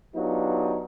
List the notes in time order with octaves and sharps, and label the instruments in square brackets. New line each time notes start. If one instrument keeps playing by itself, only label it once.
[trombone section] F#3 B3 D4 D#4 F4 G4